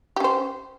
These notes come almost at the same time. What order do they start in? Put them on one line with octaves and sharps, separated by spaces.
G4 C#4 C5